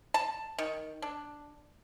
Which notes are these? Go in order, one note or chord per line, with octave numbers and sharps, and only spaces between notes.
A5
D#3
D4